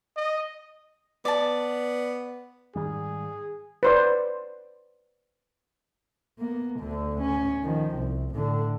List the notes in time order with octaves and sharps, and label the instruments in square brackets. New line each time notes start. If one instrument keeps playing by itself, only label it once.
[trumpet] D#5
[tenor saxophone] B3 [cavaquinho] D5 A5
[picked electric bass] G#2 D#3 G3 [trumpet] G#4
[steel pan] B4 C5 D5
[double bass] A#3 B3
D2 D3
C#4
D#3 F3
C2
A2 D3